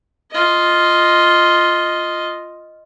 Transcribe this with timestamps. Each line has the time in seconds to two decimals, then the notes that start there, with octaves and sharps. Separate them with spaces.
0.31 F4 D#5